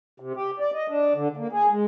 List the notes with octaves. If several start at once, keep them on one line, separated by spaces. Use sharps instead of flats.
C3
G4
D5
D#5
D4
D3
A#3
G#4
G#3